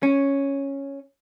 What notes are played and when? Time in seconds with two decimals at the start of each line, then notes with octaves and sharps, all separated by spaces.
0.03 C#4